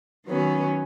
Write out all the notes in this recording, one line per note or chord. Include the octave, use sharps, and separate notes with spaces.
D#3 F#3 B3 C#4